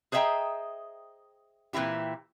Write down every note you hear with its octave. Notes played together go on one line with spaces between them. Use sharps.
G#4 C5 D#5 E5 G5 A#5
A#2 E3 C4 E4 G4